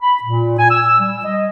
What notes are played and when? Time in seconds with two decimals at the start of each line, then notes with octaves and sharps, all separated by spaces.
0.02 B5
0.23 A#2
0.59 G#5
0.70 E6
0.99 G3
1.25 D#5